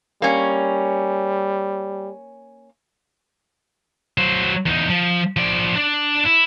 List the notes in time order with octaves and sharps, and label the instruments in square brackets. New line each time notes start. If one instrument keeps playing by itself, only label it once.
[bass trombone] G3 [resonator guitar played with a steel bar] A#3 C#4
[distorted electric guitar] F#3 C5
E2 D#4
F3
F3 D5
D4 D5
E4